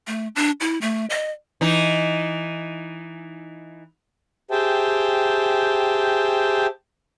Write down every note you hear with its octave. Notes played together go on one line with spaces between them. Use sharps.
A3
D4
E4
A3
D#5
E3 D#4
G4 G#4 C5 E5 G5 A5